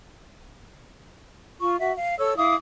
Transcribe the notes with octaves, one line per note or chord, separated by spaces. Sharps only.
F4 C#6
F#4 E5
F5
A4 C#5 E6
E4 F5 D6 D#6